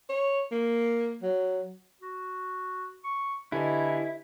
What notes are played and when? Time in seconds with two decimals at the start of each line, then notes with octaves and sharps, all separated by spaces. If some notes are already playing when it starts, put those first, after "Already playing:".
0.09 C#5
0.51 A#3
1.22 F#3
2.01 F#4
3.04 C#6
3.52 D3 E4 G4 B4 D#5 G#5